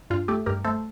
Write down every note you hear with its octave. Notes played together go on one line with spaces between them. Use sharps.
G2 F4
A3 G4
G2 G4 A#4
A3 A4 C5